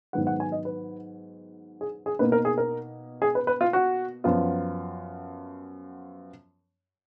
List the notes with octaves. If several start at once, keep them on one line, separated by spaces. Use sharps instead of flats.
G#2 D#3 F#3 B3 F#5
F#5
G#5
D#5
B4
G#4
G#4
B2 A#3 D#4 B4
A#4
G#4
A#4
G#4
B4
B4
F4
F#4
F#2 F3 B3 F4